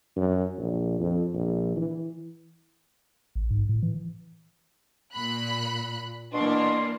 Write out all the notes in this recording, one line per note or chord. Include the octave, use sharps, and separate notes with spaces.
F#2
A#1
F2
A#1
E3
A1
G#2
A2
E3
A#2 B5 F#6
B2 E3 A#3 D4 C6